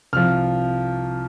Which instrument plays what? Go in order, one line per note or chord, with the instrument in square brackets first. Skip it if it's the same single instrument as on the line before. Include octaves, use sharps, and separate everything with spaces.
[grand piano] C2 C3 F3 F6